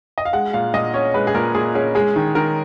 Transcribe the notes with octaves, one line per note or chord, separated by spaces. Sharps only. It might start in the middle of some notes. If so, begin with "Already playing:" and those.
D#5
F5
G#3 F#5
A#2 F5
A#2 D#5
C#4 C#5
G#3 B4
G#4
A#2 A#4
A#2 G#4
C#4 G#4
G#3 G#4
D#3
D#3 A#4